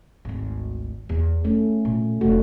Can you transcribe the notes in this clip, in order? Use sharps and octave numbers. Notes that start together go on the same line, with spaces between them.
G#1 D2
E2
A3 C#4 E4
A#2
E1 A3 F#4